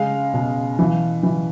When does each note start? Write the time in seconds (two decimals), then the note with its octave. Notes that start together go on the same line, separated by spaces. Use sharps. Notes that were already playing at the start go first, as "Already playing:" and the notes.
Already playing: C#3 G#3 F5
0.34 B2
0.79 E3
1.23 E3